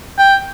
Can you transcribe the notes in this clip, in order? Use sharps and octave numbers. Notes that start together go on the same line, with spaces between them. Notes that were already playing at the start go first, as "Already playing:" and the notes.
G5